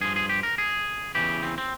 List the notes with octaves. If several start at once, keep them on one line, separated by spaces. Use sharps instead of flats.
G2 F3 G#4
G#4
G4
A#4
G#4
E2 C#3 E3 G4
C4
C4